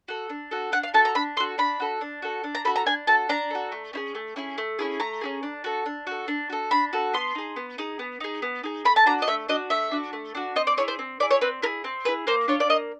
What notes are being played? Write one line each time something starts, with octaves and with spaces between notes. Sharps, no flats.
F#4 A4
D4
F#4 A4
D4 F#5
F5
F#4 A4 A5
A#5
D4 B5
F#4 A4 C6
D4 B5
F#4 A4
D4
F#4 A4
D4
A#5
F#4 A4 B5
A#5
D4 G#5
F#4 A4 A5
D4 A#5
F#4 A4
A3
C#4 E4 G#4
A3
C#4 E4 G#4
A3
C#4 E4 G#4
A3 A#5
C#4 E4 G#4
D4
F#4 A4
D4
F#4 A4
D4
F#4 A4
D4 B5
F#4 A4
B3 C6
D#4 G#4
B3
D#4 G#4
B3
D#4 G#4
B3
D#4 G#4
A3 B5
A5
D4 F#4 A#5
D#5
A3 E5
D4 F#4 D#5
A3 E5
D4 F#4
A3
D4 F#4
C4 D#5
D5
E4 G#4 C#5
C5
C4
E4 G#4 D5
C#5
C4 B4
E4 G#4 A#4
C4
E4 G#4 B4
A#3 C5
D4 F4 C#5
D5
A#3 D#5